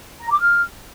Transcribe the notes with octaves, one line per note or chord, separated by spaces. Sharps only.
A#5
D6
F6